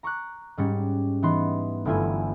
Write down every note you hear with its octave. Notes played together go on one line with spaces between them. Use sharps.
A#5 C#6 D6 F#6
G#2 G3 C#4 C#7
E3 B3 D#4 C6
G1 F#3 A3 E4 F4 G#5